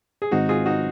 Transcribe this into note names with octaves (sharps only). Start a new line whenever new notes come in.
G#4
G#2 D#3 G#3 C4 D#4 F#4
F4 G#4
D#4 F#4